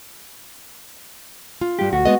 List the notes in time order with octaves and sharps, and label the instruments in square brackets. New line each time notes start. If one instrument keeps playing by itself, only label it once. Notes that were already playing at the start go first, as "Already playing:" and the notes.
[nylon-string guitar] F4
[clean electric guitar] G2 G4
[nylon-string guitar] D2 [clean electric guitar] F#4
[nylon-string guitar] G#3 B3 D#5